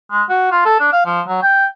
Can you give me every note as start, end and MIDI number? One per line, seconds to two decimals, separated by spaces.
0.11 0.23 56
0.29 0.50 66
0.52 0.64 65
0.66 0.76 69
0.80 0.88 62
0.93 1.03 77
1.06 1.21 53
1.27 1.39 54
1.42 1.66 79